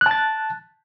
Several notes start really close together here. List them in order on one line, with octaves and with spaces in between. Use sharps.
F#6 A5 A6